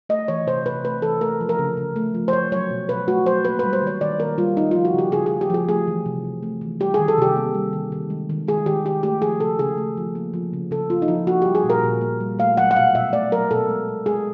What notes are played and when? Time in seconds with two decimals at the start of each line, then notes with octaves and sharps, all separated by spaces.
0.09 A3 D#5
0.28 E3 C#5
0.47 C3 C5
0.65 C3 B4
0.84 A3 B4
1.02 E3 A4
1.21 A3 A#4
1.41 F3
1.49 A#4
1.59 C#3
1.77 C#3
1.96 A3
2.14 F3
2.28 C5
2.33 A3 C#5
2.52 F#3 C#5
2.70 B2
2.89 B2 B4
3.08 A3 F#4
3.26 F#3 C5
3.45 A#3 B4
3.59 G3 B4
3.73 C5
3.82 D#3 C#5
4.01 D#3 D5
4.19 A#3 A#4
4.38 G3 F4
4.56 A3 D#4
4.71 F3 F4
4.85 F#4
4.94 C#3 G4
5.12 C#3 G#4
5.26 G#4
5.31 A3
5.41 G4
5.50 F3 G#4
5.69 A3 G#4
5.88 E3
6.06 C3
6.25 C3
6.43 A3
6.61 E3
6.80 G3 G4
6.94 D#3 G#4
7.08 A4
7.18 C3 G4
7.36 A#3
7.54 G3
7.73 D#3
7.92 D#3
8.10 G#3
8.30 D#3
8.48 G#3 G#4
8.66 D#3 G4
8.85 G#3 G4
9.03 A3 G4
9.22 F3 G#4
9.40 C#3 A4
9.59 C#3 G#4
9.78 A3
9.97 F3
10.15 A#3
10.34 F3
10.53 C#3
10.71 C#3 A4
10.90 A#3 F4
11.02 D#4
11.08 F3 E4
11.27 A#3 F#4
11.42 G3 G4
11.55 G#4
11.64 A#2
11.70 A#4
11.84 A#2
12.01 A#3
12.20 G3
12.39 A3 F5
12.57 F#3 F#5
12.71 F#5
12.76 B2 F5
12.95 B2 E5
13.13 A3 D5
13.32 F#3 A#4
13.51 B2 A4
13.69 G#3
13.89 B2
14.06 G#3 G#4